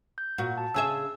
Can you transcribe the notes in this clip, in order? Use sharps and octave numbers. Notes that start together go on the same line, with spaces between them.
G6
A#2 F#4
A5
C#3 G#4 E5 E6